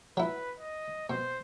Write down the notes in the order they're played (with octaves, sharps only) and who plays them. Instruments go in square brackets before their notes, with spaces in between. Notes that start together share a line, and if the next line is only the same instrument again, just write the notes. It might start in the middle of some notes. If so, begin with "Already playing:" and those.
[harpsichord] F#3 E4 [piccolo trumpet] B4
[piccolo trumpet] D#5
[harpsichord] B2 [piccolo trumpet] C5